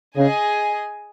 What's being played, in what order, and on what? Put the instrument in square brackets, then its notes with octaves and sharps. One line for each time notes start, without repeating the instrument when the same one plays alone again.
[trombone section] C#3 [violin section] G#4 D#5 G#5